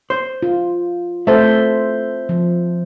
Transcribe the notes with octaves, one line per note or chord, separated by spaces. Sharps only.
C5
F4
A3 A4 C5 E5
F3